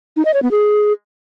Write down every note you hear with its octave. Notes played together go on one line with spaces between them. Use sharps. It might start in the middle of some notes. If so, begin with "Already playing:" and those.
D#4
D#5
C#5
B3
G#4